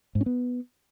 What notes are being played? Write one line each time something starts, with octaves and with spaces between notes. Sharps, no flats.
G#2
C#4
B3